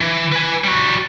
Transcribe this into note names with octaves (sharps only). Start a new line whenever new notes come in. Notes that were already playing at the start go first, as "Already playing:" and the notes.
E3
B4 G#5
G3 F#4